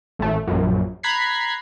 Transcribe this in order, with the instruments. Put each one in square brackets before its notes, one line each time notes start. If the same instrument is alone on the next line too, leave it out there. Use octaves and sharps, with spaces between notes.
[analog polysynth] A1 A3
A#1 F#2
A#5 B5 F#6 G#6 B6 C7